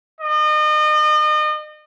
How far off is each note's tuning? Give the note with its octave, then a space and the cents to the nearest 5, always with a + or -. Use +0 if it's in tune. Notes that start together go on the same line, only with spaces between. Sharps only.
D#5 -35